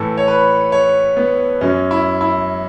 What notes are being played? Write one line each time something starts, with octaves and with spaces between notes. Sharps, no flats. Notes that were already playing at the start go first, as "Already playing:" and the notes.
Already playing: A2 E3 A4
C#5
B4
C#5
B3
F#2 F#3 C#4
E4
E4